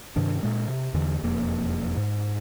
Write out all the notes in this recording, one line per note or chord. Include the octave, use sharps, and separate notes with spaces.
G2 C3 D#3 D4
A#2 G#3
C3
E2 D3 E3
E1 F2 A#3
G#2